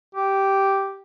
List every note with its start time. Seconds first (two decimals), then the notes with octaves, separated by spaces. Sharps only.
0.15 G4